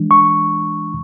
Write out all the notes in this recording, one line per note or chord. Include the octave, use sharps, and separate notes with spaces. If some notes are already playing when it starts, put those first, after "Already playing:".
Already playing: E3 G#3 D4
C#6